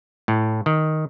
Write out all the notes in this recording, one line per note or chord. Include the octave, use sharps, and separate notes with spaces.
A2
D#3